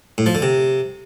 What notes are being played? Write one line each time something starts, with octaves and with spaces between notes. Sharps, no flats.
A2
F3
D3
C3